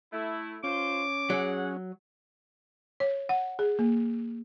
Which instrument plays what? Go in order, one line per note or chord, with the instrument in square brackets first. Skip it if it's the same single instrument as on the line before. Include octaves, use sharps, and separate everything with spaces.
[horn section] A3 E4
[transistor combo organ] C#4 [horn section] F4 C5 [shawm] D6
[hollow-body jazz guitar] F#3 [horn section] G#4 F#5
[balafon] C#5
F#5
G#4
A#3